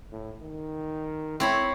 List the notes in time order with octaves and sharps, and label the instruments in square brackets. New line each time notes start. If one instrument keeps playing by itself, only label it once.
[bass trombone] A2
D#3
[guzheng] C4 C#5 B5 [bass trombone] E4